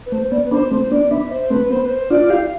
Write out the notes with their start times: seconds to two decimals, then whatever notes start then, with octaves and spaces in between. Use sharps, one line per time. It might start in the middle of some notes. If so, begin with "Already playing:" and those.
0.06 B4
0.12 A3 C5
0.32 B3 D5
0.44 B4
0.51 B3 D4 C5
0.71 A3 C4 C5
0.91 B3 D4 D5
1.10 B3 D4 E5
1.31 C5
1.50 A3 C4 B4
1.70 B3 C5
1.85 B4
1.90 C5
2.10 D4 F4 D5
2.24 F4
2.30 E4 G4 F5